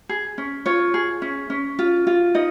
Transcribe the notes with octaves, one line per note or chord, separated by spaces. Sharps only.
G#4
C#4
F4 C#5
G#4
C#4
C#4
F4
F4
D#4 D#5